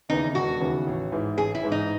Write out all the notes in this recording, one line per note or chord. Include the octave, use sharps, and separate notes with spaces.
D#2 C#3 E3 B3 D#4
E1 F#4
D#2 C#3 E3 B3
A1
G#2 E3
A1 G#4
E4
G#2 E3
D#4